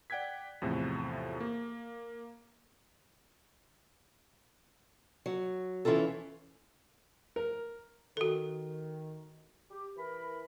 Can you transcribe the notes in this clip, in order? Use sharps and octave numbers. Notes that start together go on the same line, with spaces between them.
D5 F#5 G5 F#6 G#6 B6
E2 A2 C3 F3 A3
A#3
F#3
E3 C#4 E4 F4 A4
A#4
D#3 F#4 A4
G4
E3 A#4 B5